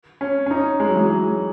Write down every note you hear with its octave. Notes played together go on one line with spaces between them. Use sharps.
C#4
C#4
D#4
G#3
F#3
E3
F#3
G#3